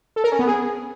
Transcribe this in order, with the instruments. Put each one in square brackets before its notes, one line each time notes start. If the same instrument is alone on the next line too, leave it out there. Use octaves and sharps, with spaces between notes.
[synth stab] A4
A#4
C#4
B3
G#4